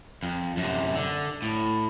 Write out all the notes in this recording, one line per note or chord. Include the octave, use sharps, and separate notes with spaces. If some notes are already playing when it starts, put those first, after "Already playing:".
F2
F#2 C3
D3
A2